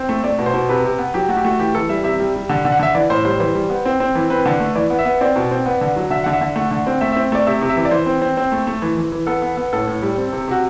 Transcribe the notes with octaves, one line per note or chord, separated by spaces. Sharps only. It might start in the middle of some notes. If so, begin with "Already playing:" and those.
Already playing: C4
A3
A3 D5
B2
C5
B2
C3 B4
C3
B3
F#3 G4
A3 F#4
G4
A3 F#4
E3 G4
E3 A4
G3 E5
C3 E5
G3
G3
D3
D3
F#5
D3 E5
E3 D5
A2 C5
G3 C5
E3 C5
G3
B3
C4
C4
E3
C4 B4
D3
A3
E3 D5
B3
E5
B3
C4 D5
B2
C4
B3
D3
F#3
D3 E5
D3 F#5
E5
D3
A3 F#5
D3
C4
A3 E5
C4 E5
A3 D5
C3 E5
C3
E5
E3
D5
E3 C5
C4
C4
C4
A3
A3
E3
E3
E3
B3 A4
B3
B3
A2 A4
A2
G3
C4
C3
C3 F#4